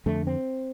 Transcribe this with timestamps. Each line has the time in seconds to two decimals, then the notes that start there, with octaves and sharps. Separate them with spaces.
0.06 F2 D3 A3
0.27 C4